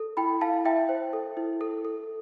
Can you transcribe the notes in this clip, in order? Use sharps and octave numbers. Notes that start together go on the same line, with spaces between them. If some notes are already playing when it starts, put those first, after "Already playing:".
Already playing: A4
E4 G5 B5
E4 F5 A5
E4 E5 G5
C5
A4
E4
A4
A4